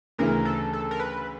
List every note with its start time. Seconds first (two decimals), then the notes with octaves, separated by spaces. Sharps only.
0.18 D2 C#3 E3 A#4
0.45 A4
0.73 A4
0.91 A#4
0.99 B4